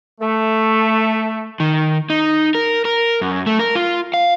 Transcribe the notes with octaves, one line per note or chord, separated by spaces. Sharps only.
A3
D#3
D#4
A#4
A#4
F#2
A3
A#4
F4
F5